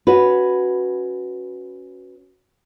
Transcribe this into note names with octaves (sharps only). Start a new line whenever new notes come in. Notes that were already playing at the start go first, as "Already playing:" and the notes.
C#4 F#4 B4